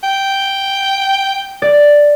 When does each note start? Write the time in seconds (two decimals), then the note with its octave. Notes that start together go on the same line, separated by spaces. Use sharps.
0.03 G5
1.62 D5